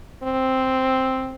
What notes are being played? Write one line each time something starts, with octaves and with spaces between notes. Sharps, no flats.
C4